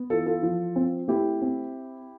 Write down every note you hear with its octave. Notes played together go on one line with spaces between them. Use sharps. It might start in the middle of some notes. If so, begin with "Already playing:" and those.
Already playing: B3
E3 F4 A4
F4 A4
F3
C4
A3 E4 G4
C4